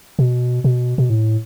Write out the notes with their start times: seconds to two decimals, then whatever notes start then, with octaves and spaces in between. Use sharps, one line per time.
0.19 B2
0.64 B2
0.98 B2
1.10 A2